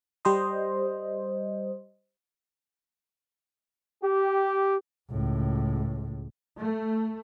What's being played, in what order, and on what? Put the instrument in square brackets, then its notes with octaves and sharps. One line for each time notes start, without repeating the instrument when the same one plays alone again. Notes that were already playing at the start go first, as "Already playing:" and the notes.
[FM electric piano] G3 C5 D#5
[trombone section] G4
[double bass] C#2 A2
[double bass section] A3